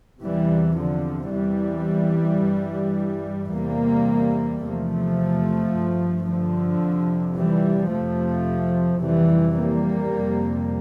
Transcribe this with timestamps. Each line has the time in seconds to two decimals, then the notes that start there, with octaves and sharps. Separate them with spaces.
0.23 E2 C3 E3 G3
0.78 D3 F3
1.33 E2 C3 E3 G3
2.43 G2
3.52 E2 C3 G3 A#3
4.62 E2 C3 F3 A3
5.73 G2
6.27 D3 F3
6.82 F2 C3
7.36 E3 G3
7.91 F2 C3 F3 A3
9.01 F2 C3 E3 G3
9.57 G3 A#3
10.11 F2 C3